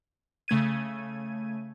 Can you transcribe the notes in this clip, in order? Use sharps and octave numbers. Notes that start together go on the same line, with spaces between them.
C#3 A3 G#6 D#7